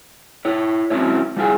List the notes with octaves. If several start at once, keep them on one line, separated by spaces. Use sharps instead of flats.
E4 C#5
F#3 C4 C#4 E4 C#5
G3 E4 F4 G#4